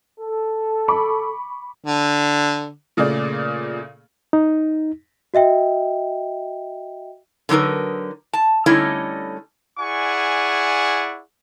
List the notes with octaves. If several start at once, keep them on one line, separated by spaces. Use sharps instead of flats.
A4
B5 C#6 D6
D3
A#2 C#3 A3 G#4 D5
D#4
F#4 D#5 E5 G5
D3 F#3 D#4 A#4 B4
A5
D3 G3 A3 C#4 D#4 E4
E4 G#4 D5 F#5 G#5 C#6